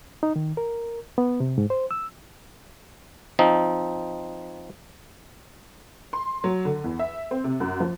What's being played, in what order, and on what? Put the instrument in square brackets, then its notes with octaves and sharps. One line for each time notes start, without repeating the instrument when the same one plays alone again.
[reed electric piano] D#4
D#3
A#4
B3
C3
G#2
C5
E6
[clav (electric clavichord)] F3 C4 D#4
[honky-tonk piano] C6
F#3
D3
E2
E5
C4
C3
F#2
F3